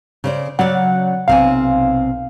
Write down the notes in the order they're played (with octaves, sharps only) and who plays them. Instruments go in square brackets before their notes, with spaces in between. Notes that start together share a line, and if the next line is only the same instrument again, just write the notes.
[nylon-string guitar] C#3 C5 D5
[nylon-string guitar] C#3 D5 [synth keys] F#3 F#5
[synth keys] B1 F5 [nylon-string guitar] C3 C4 G#5